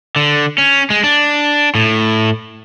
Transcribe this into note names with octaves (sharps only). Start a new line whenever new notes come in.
D3
C#4
G#3
D4
A2